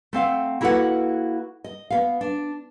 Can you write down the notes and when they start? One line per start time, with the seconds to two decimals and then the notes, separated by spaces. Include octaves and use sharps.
0.13 A3 C4 F5 F#5
0.61 A#3 E4 F#4 A4 B4 F#5
1.64 D#5
1.90 B3 F5
2.21 D4